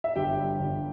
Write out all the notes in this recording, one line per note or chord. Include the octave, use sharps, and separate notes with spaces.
E5
G1 G4 G5
G3
G1